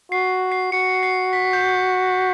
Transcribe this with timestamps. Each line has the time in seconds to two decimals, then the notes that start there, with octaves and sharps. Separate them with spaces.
0.12 F#4 C7
0.52 C7
0.72 F#4 C#7
1.03 C7
1.33 B6
1.53 G6